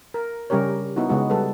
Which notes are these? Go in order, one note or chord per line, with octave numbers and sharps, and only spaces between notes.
A#4
C#3 G3 C#4 G4 A#4 C#5
B3 D#4 E4 F#4
C#3 G#3 B3 F#4
G3 G#4 A4 B4